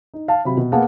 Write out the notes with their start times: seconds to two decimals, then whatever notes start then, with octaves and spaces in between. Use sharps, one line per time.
0.14 D#4
0.28 F5 A5
0.45 C3 F#3 B5
0.57 B2
0.72 A#3 B3 G#4 F5 F#5 A5